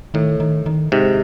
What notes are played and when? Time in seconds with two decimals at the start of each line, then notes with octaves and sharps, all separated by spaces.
0.14 A2 D#3
0.40 D#3
0.66 D#3
0.92 G#2 C3